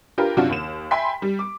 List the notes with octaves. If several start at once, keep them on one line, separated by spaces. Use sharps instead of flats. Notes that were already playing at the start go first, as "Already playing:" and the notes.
D4 F4 G4 A#4 B4
F#2 C3 D4 F4 F#4
D#2 E7
E5 G5 G#5 B5 C6 B6
G3
D6